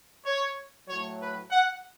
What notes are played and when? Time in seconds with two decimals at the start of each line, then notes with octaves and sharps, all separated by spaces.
0.25 C#5
0.88 A2 F#3 C#5
1.19 B4
1.50 F#5